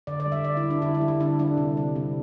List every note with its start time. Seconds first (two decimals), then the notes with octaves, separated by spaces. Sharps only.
0.07 D3 D5
0.20 D5
0.26 G3
0.32 E5
0.44 D3 D5
0.57 E4
0.63 G3
0.70 D4
0.82 D3 E4
0.94 E4
1.01 G3
1.08 E4
1.20 D3 D4
1.39 G3 D4
1.57 C3
1.77 G3
1.96 C3